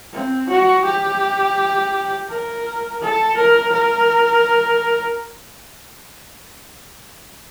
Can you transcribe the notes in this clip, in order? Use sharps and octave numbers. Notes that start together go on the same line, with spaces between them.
C4
F#4
G4
A#4
A4
A#4
A#4